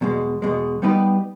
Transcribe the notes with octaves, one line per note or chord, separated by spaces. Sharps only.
E2 B2 G#3
E2 B2 G#3
G3 B3 D#4 G4 B4